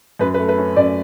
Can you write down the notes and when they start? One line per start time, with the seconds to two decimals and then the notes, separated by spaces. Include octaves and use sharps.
0.19 F#2 B4
0.34 B4
0.39 A3
0.49 B4
0.58 C#4
0.76 F#2 D5